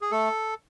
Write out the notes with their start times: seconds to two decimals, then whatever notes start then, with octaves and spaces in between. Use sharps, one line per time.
0.02 G#4
0.11 A3 A4